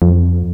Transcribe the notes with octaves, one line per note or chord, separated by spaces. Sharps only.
F2